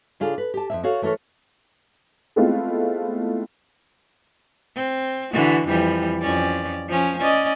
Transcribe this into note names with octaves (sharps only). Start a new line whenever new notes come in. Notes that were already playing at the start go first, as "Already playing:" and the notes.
C#3 D4 F4 G#4 A4
B4
G4 A5
F2 C#3 E5
F#4 A4 C#5 F5
E3 A3 A4 A#4 C#5
G#3 A3 B3 C4 E4 F4
C4
D3 E3 F#4
F2 E3 G3
F2 C#4 D5
F3 C#4
C#4 D5 D#5